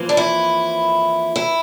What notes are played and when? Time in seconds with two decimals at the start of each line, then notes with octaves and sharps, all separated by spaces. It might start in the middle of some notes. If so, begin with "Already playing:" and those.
Already playing: F2 E3 A#3
0.09 D4
0.17 E4
1.36 E4